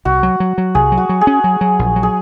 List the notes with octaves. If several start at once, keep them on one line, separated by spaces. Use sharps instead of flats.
C2 F#4
F#3
F#3
F#3
C2 G#4
F#3
F#4
F#3
G#4
C#4
F#3
F#3
A#1
F#3
G#4